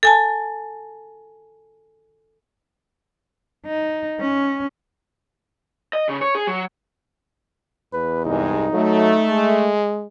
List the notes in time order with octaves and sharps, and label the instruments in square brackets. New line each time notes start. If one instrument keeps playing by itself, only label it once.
[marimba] A4 G#5 A5
[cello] D#4
C#4
[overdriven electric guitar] D#5
C#3
C#5
G#4
F#3
[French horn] E2 [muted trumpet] B4
[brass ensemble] C2 G2 G#3 [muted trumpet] D#4
[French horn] F#3 [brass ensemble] A3
[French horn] G#3